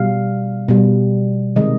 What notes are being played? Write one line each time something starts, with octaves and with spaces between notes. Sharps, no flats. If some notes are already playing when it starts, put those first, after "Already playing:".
Already playing: B2 G3 F5
B2 G3
C3 D#3 G#3 D#5